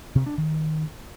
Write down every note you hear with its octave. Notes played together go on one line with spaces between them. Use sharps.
C3
D4
D#3